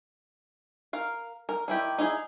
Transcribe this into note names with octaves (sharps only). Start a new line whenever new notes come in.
A#4 F5
A#4
D#3 E4 G4
D#4 E4 G#4